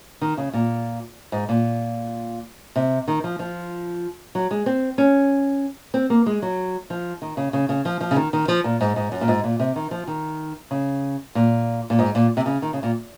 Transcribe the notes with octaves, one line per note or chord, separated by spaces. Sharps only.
D#3
C#3
A#2
G#2
A#2
C3
D#3
F3
F3
F#3
G#3
C4
C#4
C4
A#3
G#3
F#3
F3
D#3
C#3
C#3
C#3
F3
F3
C#3
D#3
D#3
F3
A#2
G#2
G#2
F#2
A#2
G#2
A#2
C3
D#3
F3
D#3
C#3
A#2
A#2
G#2
A#2
C3
C#3
D#3
C#3
A#2